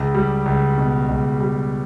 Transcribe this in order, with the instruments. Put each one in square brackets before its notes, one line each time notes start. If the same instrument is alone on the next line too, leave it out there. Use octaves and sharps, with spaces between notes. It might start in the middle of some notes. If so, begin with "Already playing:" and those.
Already playing: [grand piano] C#2
G3
C#2
B2
C#2
G3